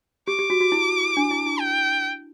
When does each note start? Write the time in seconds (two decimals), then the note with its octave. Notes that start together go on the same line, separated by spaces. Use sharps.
0.27 G4 D6
0.39 G4
0.50 F#4
0.61 F#4
0.72 E4
1.17 D4
1.31 E4
1.46 E4
1.60 G5